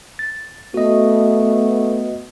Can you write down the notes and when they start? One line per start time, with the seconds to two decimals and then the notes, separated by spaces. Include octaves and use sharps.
0.19 A6
0.74 A3 B3 F#4 D#5